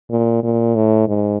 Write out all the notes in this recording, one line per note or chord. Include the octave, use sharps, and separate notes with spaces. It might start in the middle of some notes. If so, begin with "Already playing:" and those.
A#2
A#2
A2
G#2